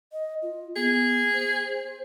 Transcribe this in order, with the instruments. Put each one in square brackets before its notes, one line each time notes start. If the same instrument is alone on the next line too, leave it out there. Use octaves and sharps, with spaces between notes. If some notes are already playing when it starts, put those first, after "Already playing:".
[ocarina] D#5
F4
[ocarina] B3 [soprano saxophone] G#4
[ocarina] C5